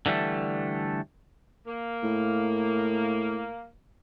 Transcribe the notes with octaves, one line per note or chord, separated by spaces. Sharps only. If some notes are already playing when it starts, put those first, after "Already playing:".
D3 E3 G3 A3
A#3
A2